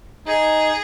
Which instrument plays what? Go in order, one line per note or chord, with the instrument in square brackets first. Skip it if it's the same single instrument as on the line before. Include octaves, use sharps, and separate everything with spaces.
[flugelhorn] D#4 [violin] G#4